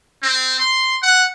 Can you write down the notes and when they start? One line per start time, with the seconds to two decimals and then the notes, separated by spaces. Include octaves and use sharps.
0.23 C4
0.59 C6
1.02 F#5